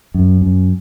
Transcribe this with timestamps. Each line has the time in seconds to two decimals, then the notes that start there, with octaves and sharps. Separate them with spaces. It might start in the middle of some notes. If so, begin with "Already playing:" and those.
0.14 F#2
0.42 F#2